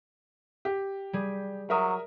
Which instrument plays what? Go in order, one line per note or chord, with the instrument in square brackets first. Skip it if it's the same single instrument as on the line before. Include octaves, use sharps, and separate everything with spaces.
[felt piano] G4
[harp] G3 G#4
[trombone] F#3 [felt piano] A#4 E5 D#6